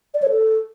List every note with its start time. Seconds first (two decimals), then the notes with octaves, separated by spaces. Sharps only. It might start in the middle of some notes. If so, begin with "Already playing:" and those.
0.14 D5
0.22 C#5
0.30 A4